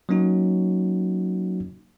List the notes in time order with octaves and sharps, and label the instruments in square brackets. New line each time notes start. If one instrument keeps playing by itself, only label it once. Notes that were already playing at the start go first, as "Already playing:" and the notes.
[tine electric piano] F#3 A#3 C#4 D#4 F#4